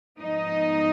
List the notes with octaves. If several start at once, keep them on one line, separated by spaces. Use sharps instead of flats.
G#2 F3 G#3 B3 D#4 D#5